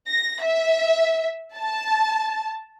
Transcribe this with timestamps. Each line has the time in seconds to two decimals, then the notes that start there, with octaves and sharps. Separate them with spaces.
0.11 A#6
0.44 E5
1.56 A5